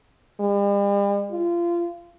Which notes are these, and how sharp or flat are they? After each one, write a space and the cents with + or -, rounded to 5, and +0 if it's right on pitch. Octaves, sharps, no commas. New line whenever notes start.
G3 +45
F4 -25